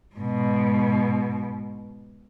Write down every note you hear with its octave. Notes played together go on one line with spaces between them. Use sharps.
G#2 B2